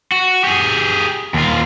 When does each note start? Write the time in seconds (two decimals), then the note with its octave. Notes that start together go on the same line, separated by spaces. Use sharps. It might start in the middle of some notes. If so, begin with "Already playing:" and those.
0.12 F#4
0.44 G4 G#4
1.34 D#2 F4